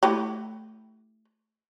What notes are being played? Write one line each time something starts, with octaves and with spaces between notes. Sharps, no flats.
A3 E4 G4